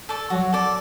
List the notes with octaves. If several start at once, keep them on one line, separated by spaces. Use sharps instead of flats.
A4 D5
F#3 F#4
A4 D5